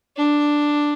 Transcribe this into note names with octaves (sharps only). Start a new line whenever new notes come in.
D4